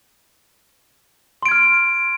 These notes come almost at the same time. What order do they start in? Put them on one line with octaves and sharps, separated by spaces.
C6 D7 G#6 F6